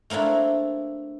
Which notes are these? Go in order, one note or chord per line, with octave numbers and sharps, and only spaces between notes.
A3 A#3 C4 D4 E4